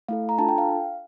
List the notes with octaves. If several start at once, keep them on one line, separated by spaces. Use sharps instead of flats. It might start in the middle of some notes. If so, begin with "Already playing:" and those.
A3 E4 A4 F5
A#5
D4 F4 A4 A5
G5
F5